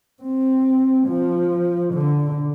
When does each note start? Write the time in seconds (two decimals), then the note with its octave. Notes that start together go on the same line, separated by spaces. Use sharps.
0.22 C4
1.07 F3
1.93 D3